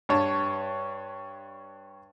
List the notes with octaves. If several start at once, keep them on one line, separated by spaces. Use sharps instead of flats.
G2 C#5 A5